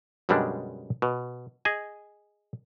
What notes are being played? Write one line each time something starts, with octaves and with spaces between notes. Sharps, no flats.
F#2 B2 D3 G3 G#3 D4
B2
G#4 D#5 G#5